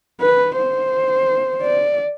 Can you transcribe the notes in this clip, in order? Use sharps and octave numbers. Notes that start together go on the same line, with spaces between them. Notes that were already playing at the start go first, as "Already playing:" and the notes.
B4
C5
D5